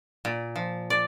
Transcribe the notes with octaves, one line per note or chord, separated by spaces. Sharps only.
A#2
F3
D5